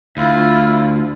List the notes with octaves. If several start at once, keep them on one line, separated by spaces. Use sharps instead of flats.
D2 E4 F4